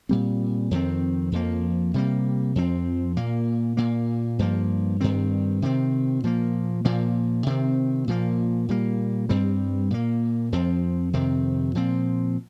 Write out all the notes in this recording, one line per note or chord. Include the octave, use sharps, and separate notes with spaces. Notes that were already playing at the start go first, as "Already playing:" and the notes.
A#2 G3 C4
F2 D#3 C4
F2 F3 A#3
C3 G3 A#3
F2 F3 C4
A#2 A#3
A#2 A#3
G2 F3 A#3
G2 D#3 C4
C3 D#3 C4
A#2 F3 A#3
A#2 F3 A#3
C3 D#3 C4
A#2 F3 A#3
A#2 G3 A#3
G2 G3 C4
A#2 A#3
F2 F3 C4
F2 C3 D#3 C4
A#2 F3 C4